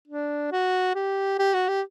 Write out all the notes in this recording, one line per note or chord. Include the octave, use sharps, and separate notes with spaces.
D4
F#4
G4
G4
F#4
G4